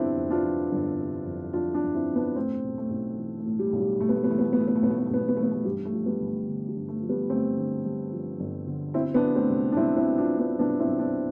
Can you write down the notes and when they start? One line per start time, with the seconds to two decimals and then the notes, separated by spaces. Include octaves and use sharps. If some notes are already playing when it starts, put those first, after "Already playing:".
Already playing: G1 F2 C3 F3 B3 C4 D4 E4
0.17 F2
0.30 D4 F4
0.44 F3
0.72 G1
0.99 C3
1.26 F2
1.53 F3 D4 F4
1.74 D4 F4
1.81 G1
1.95 C4 E4
2.09 C3
2.15 B3 D4
2.36 A2 A3 C4
2.64 B1
2.78 A3
2.90 B1
3.18 E3
3.39 A3
3.46 A2
3.59 G3
3.73 B1
3.80 G3
4.00 B1 A3
4.09 B3
4.15 A3
4.24 B3
4.27 E3 A3
4.39 B3
4.45 A3
4.53 B3
4.56 A2 A3
4.68 B3
4.75 A3
4.82 B1 B3
4.91 A3
4.98 B3
5.06 A3
5.11 B1 B3
5.21 A3
5.28 B3
5.36 E3 A3
5.43 B3
5.52 A3
5.65 G2 G3
5.85 A3
5.93 F3
6.06 G3 B3
6.19 G1
6.26 A3
6.48 D3
6.69 G3
6.75 G2
6.88 A3
7.02 F3
7.09 G3 B3
7.29 G1 A3 C4
7.57 D3
7.85 G2
8.12 F3
8.40 G1
8.67 D3
8.94 B2 C4 E4
9.14 B3 D4
9.22 B2
9.35 A3 C4
9.49 C2
9.72 D4
9.76 C2 C4 E4
9.96 C4 E4
10.04 B2
10.18 D4 F4
10.32 B2
10.38 B3 D4
10.59 C2 B3 D4
10.80 C4 E4
10.87 C2
10.99 B3 D4
11.13 B2